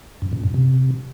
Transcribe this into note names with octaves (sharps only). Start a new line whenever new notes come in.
F#2
A#2
F#2
C3